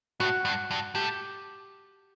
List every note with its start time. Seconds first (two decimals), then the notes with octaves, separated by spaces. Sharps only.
0.20 A2 F#4
0.45 G2
0.71 G2
0.95 A2 G4